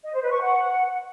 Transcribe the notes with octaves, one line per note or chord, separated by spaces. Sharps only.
D#5
C5
B4
C#6
F#5